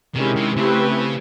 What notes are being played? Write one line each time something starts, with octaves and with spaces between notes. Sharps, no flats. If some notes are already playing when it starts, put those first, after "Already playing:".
C3 D#3 G#3 C#4 E4 G4
C3
C#3 A3 C4 E4 G4 B4